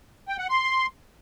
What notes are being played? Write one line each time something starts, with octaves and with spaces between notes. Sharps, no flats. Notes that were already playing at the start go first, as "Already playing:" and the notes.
G5
F#5
C6